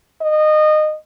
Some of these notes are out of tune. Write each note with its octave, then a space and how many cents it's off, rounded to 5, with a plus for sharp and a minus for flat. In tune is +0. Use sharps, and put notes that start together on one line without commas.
D#5 -20